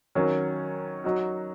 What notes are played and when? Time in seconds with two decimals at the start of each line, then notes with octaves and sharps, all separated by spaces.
0.15 D#3 F#3 C#4
1.04 F#3 D#4 F#4